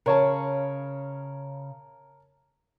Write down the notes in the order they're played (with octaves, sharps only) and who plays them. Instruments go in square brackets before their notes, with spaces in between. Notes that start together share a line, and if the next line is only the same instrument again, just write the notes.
[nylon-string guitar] C#3 [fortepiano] A#4 C#5 A5